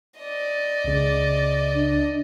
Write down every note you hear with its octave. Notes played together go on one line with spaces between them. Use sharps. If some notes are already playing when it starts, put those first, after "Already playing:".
D5 D#5
C#2 C#3
D4